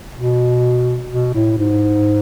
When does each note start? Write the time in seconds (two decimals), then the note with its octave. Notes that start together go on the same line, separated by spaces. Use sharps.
0.15 B2
1.10 B2
1.34 A2
1.58 G#2